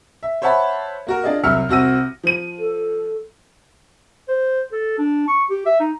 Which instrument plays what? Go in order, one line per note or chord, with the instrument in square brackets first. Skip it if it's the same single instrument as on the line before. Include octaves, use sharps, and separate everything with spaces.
[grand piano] E5
C5 C#5 E5 F#5 A5 B5
A#3 F#4 A#4
D4 F4 G#4 D5 D#5
C2 F#3 E5 E6 F6 C#7
C2 C4 F#4 E6 A#6 D#7
[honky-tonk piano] F3 D#7
[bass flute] A4
[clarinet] C5
A4
D4
C#6
G4
E5
D#4